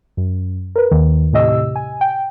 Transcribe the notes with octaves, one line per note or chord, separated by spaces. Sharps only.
F#2
A#4 B4
D#2 D#3
A2 C3 G4 D#5 E6
G#5
G5